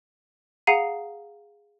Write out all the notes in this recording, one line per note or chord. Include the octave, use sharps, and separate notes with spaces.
G#4 F5 F#5 A#5 C7 D#7